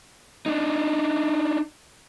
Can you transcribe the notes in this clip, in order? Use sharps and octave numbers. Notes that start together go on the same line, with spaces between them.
D4 D#4